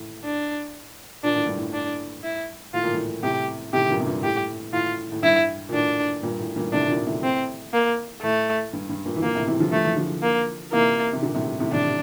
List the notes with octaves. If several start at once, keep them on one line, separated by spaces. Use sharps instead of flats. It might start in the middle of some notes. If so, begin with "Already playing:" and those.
Already playing: A2
D4
A#2 D4
A2
G2
A2
D4
E4
A2 F4
A#2
A2
A2 C3 G4
A2 C3 G4
G2 A#2
C3
G2 A#2
A2 G4
A2 F4
A2
G2 E4
A#2
A2 D4
G2 A#2
A2
G2 A#2
A2 C3 D4
A#2 D3
A2 C3
C4
A#3
A2 A3
G2
G2
G2 A#2
E3
A#2 D3 A#3
A2 C3
C3 E3
D3 F3
F3 A3
E3
D3 F3
A#3
C3 E3 A#3
C3
A#2 D3
A2 C3
A2 C3
A2 C3 D4